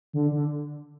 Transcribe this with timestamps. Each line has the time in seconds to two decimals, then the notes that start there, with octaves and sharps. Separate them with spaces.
0.13 D3
0.31 D3